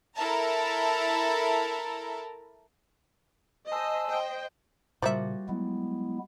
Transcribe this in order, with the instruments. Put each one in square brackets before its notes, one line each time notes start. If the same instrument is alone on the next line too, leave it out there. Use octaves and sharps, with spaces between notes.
[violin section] E4 A4 A#4 E5 A5 A#5
[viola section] C5 D#5 [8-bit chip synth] G#5 A5 E6
[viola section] C5 D#5 G5
[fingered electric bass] A#2 C#3 [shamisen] F3 A#3 E5 [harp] G3 F#4 A6
[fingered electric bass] F#3 [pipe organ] G#3 B3 E4